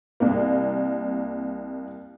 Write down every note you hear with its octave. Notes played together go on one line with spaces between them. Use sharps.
C2 A#3